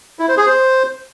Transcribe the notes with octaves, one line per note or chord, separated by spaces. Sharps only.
E4
C5
G#4
C5